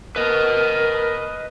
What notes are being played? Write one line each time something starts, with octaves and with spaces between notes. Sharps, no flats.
A#4 B4 D#5